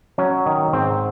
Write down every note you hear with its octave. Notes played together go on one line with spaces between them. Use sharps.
F#3 C#4
D#3
G#2 C4